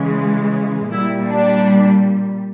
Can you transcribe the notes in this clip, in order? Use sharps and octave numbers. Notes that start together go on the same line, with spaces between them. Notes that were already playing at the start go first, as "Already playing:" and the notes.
Already playing: C#3 E3 G#3
A#2 G3 E4
D4